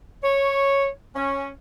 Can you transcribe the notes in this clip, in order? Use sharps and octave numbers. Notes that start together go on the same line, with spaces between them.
C#5
C#4